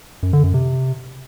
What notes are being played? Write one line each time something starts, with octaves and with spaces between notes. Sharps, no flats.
F#2
D3
F#2
C3